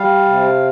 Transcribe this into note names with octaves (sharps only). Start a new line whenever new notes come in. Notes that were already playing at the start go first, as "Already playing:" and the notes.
Already playing: G3 F5
C3